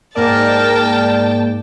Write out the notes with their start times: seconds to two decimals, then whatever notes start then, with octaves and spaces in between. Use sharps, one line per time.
0.15 G#2 A#3 A#4 D5 G5 A5